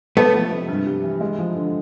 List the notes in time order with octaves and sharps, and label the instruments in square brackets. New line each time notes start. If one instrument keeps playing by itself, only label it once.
[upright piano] G#3 [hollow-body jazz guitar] A3 B3
[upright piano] F3
C3
G2
G3
E3
G#3
F3
D3